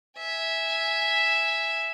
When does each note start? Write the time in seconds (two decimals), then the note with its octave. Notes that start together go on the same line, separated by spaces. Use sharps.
0.18 E5 G#5